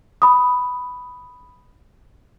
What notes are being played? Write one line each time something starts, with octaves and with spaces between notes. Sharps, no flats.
B5 D#6